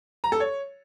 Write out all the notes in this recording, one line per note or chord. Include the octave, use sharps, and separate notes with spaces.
A#5
A4
C#5